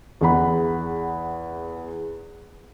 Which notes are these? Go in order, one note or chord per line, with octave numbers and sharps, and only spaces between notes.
E2 E3 G#4 F#5 B5